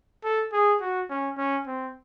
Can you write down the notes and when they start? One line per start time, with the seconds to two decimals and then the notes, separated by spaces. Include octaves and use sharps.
0.24 A4
0.53 G#4
0.81 F#4
1.10 C#4
1.37 C#4
1.67 C4